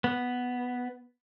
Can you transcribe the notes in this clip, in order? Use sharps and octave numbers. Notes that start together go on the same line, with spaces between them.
B3